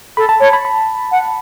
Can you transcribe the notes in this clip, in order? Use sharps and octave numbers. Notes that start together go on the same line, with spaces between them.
A4 B5
A5
C#5 A5
B5
B5
F#5